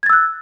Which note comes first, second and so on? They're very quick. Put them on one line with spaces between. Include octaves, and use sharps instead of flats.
G#6 A6 E6 F#6